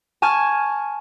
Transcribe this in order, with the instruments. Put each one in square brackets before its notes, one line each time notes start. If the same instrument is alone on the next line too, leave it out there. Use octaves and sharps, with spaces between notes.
[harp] G#5 A5 C#6 F6 G#6